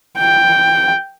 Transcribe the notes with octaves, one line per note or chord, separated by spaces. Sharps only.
G5